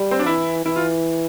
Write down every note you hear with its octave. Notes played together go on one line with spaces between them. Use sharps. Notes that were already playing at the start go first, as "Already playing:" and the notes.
Already playing: G3
C4
D4
E3 E4
E3 E4
F4